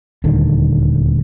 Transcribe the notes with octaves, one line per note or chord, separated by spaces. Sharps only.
D#1 D2 D3 D#3